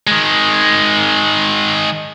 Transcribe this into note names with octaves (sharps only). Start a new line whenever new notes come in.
D#3 G#3